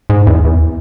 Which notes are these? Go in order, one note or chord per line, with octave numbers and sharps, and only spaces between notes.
G#2
E2
E2